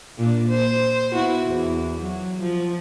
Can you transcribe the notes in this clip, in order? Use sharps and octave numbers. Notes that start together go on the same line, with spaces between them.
A#2 D4
C5
B3 E4 F#4
E2
F#3
F3